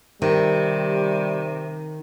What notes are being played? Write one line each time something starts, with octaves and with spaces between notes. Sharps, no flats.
C3 D#3 G3